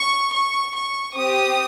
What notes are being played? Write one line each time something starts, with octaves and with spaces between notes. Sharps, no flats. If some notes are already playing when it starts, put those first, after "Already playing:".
Already playing: C#6
C#6
C#6
C4 G4 D#6